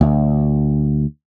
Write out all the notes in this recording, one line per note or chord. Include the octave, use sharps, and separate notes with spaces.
D2